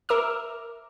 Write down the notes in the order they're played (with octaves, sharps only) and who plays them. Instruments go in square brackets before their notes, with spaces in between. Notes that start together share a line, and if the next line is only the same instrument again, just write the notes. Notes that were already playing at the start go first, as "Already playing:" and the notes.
[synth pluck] A#4 E5 D6 E6 F6